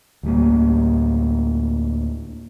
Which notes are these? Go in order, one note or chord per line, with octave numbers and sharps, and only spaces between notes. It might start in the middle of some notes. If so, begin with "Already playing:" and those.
D2 A2 G3 A#3